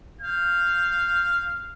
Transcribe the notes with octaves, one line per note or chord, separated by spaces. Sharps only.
F5 G6